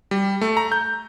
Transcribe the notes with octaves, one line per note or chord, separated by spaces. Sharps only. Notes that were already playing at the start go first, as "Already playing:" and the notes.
G3
A3
A#5
G6